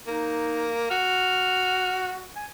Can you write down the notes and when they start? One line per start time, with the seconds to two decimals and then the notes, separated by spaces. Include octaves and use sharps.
0.07 A#3 D#4
0.91 F#4 F6
2.36 G#5